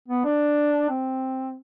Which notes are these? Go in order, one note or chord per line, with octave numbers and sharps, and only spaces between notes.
B3
D4
C4